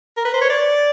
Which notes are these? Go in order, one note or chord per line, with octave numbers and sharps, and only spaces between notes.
A#4
B4
C5
C#5
D5